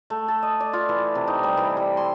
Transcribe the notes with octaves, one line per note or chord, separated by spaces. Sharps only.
A3
A4
D#5
D5
F4
E3
C3
D#4
G3
E3
G3
C6